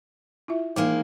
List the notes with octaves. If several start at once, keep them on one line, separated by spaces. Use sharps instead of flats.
E4 F4 E5
D#3 E3 G#3 A#3